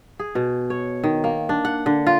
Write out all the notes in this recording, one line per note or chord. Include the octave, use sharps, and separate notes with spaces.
G#4
B2
C#5
D#3
A#3
D4
F#5
D3
F4